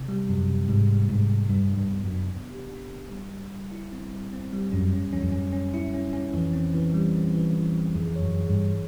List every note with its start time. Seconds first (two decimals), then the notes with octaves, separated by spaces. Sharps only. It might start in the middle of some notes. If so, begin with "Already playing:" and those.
Already playing: C3
0.09 G3
0.29 F#2 C3
0.49 C3
0.69 G#2 G3
0.89 G3
1.09 G#2 C3
1.30 C3
1.49 G2 D4
1.70 D4
1.77 G2
1.90 B3
2.04 F#2
2.11 D4
2.30 B3
2.50 G4
2.70 D4
2.91 D4
3.11 G3
3.31 G3
3.51 G3
3.71 E4
3.92 C4
4.12 G3
4.33 C4
4.53 G3
4.72 F#2 C#4
4.92 C#4
5.13 F2 C#4
5.23 F2
5.32 F#2 C#4
5.53 C#4
5.74 E4
5.94 C#4
6.13 C#4
6.33 F2 E3
6.53 C4
6.74 E3
6.94 G3
7.14 C4
7.34 E3
7.55 E3
7.74 E3
7.95 F2 G#4
8.16 C#5
8.22 F#2
8.36 G#4
8.49 G2
8.55 C#5